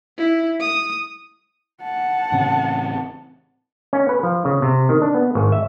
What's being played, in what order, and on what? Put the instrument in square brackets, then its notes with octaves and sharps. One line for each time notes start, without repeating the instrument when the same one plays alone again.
[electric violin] E4
D#6
[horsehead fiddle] F#5 A5
[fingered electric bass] A1 C#3 C4
[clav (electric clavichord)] C#4
B4
F3
C#3
C3
D#3
D4
B3
G#1
E5